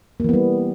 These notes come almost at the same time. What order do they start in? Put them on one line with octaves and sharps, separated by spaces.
A#3 E3 B3 G3